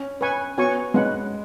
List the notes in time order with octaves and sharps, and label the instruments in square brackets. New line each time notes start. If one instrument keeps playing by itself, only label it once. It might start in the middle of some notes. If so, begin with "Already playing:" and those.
Already playing: [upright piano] C#4
[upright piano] C#4 [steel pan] B4 G#5 C#6
[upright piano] B3 [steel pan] F#4 C#5 G#5 C#6
[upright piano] G#3 [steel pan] C#4 B4 F#5